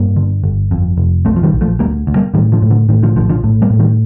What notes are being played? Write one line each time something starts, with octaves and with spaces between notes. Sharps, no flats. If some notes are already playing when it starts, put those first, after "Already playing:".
Already playing: G2 G3 A#3
D3
G1
F2
F1
A#1 A3 C4
F3
D#3 G3
A#1
F3 A3
D2 G3 A#3
D2
G3 A#3
A2 D#3 G3
D3 F3
A2
D3
A2 D#3
D3 F3
A#1 D3 F3
D3 F3
A2
G3 A#3
A2
D#3 G3